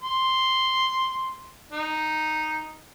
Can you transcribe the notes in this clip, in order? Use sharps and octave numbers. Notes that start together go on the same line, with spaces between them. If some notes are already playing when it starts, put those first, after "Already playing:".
C6
D#4